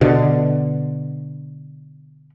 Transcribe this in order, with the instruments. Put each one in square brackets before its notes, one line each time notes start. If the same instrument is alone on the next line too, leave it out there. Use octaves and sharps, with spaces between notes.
[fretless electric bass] B2 D3